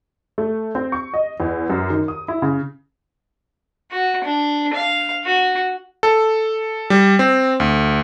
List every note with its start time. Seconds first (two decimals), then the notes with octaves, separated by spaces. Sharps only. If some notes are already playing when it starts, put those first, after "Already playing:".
0.38 A3
0.75 C4
0.92 C#6
1.14 D#5
1.40 E2
1.70 F#2
1.90 D#3
2.08 D#6
2.28 E4
2.42 C#3
3.91 F#4
4.25 D4
4.74 F5
5.25 F#4
6.03 A4
6.90 G3
7.19 C4
7.60 D2